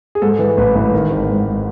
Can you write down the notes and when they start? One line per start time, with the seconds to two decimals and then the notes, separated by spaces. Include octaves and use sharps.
0.15 G#4
0.22 G#2 A4
0.39 E3
0.57 A1 B4
0.75 A1
0.93 D#3
1.11 G#1
1.29 G#2